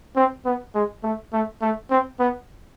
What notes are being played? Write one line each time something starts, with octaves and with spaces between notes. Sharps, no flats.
C4
B3
G#3
A3
A3
A3
C4
B3